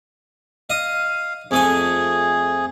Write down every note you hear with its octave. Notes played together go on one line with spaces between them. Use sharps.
D#5 F5 D#6
F2 A3 G#4 G#5